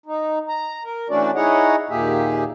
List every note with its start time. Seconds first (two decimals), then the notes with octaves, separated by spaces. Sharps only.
0.06 D#4
0.49 A#5
0.84 A#4
1.10 E3 A3 C#4 D4 F#4 D5
1.35 D#4 E4 G#4 C#5 D#5 F#5
1.90 D#2 A#2 A#3 G4 G#4 E5